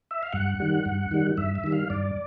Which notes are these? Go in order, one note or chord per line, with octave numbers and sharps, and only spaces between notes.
E5
F5
G2 F#5
D#3 G3
G2
D#3 G3
G2 E5
E5
D#3 G3
F5
G2 D5